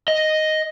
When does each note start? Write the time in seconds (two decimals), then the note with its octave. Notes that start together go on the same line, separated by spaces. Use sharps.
0.08 D#5